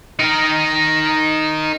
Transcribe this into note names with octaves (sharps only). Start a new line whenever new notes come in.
D#4 A#4